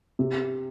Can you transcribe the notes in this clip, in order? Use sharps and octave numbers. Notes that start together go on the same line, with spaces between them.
C3